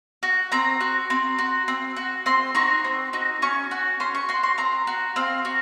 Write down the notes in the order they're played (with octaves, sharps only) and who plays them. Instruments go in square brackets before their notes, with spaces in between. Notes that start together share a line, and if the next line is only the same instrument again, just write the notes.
[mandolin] F#4
C4 A#5
F#4
C4
F#4
C4
F#4
C4 C6
D#4 F#4 C#6
C4
D#4 F#4
C#4 C#6
F#4
C#4 C6
C#6
F#4 C6
C6
C4 A#5
F#4
C4 F5
F#4